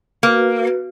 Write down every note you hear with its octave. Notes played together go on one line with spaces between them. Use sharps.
A#3 F#4 B4